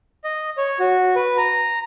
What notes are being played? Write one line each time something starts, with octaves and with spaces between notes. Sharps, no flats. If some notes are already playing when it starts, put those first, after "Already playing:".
D#5
C#5
F#4
B4
A#5